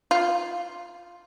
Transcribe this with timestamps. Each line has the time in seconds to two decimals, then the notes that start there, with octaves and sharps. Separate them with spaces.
0.11 F4